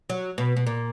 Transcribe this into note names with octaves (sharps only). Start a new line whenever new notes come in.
F#3
B2
B2
A#2